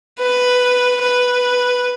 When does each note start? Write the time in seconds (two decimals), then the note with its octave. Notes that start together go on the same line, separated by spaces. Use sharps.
0.20 B4
1.01 B4